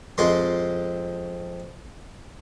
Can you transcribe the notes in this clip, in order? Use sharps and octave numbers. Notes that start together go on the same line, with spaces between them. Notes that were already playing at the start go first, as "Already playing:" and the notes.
F2 G#3 C6